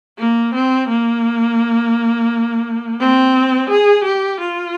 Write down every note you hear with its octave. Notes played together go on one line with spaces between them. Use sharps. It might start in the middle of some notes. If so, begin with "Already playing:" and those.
A#3
C4
A#3
C4
G#4
G4
F4